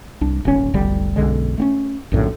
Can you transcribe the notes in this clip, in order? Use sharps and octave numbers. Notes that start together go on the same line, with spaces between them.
C2 D4
D#1 G#1 D#2 C#4
F1 B1 D3 G3
B1 F#2 D3 G#3
A3 C4 C#4
A#1 F#2 A2 D3